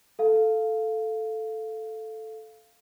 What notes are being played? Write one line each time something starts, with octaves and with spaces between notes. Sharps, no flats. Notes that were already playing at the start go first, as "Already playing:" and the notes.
A4 F5